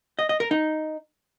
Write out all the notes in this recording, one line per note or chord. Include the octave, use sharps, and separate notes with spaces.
D#5
D#5
A#4
D#4